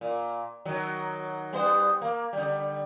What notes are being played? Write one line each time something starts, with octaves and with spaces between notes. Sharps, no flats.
A#2
D#3 F#3
G3 B3 C5
A#3
D3 G3